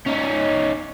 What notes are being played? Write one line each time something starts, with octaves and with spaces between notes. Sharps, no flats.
C#4 D#4